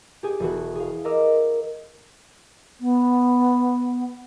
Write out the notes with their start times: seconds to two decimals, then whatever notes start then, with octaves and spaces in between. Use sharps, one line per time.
0.23 G4 G#4 G#5
0.40 E1 E3 F#4
0.75 G#4 F5
1.05 A#4 D#5 A#5 D6 E6 F6
2.81 B3